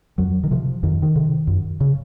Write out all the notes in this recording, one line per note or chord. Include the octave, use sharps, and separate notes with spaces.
F2 F#3
D#3
C3 F3
F2 D#3
D#3
C3
F#2
C#3